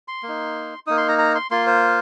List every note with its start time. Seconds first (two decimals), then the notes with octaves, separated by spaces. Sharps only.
0.08 C6
0.23 A#3
0.28 D#4
0.87 A#3 D#4 D#6
0.98 C6
1.09 A#5
1.19 A#5
1.35 C6
1.51 A#3 F4 C6
1.67 C5